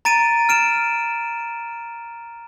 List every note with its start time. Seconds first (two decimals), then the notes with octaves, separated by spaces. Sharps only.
0.05 A#5 A6 D7 D#7
0.49 F6 D7 E7